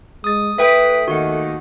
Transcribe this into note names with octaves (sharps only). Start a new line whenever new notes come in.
G#3 D#6 A6
A3 E4 B4 E5 G5 D#6
D#2 D#3 F#4 F#5